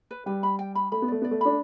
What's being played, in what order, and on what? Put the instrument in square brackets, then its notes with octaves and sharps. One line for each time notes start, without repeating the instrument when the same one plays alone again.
[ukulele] B4
[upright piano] G3 [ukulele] B4
[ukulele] B5
G5
B5
[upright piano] A3 [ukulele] B5
[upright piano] B3
[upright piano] A3 [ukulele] D5
[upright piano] B3 [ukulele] D5
[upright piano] A3
[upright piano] D4 [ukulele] B5